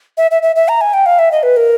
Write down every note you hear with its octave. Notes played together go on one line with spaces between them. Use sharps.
E5
E5
E5
E5
A#5
G#5
G5
F5
E5
D#5
B4
A#4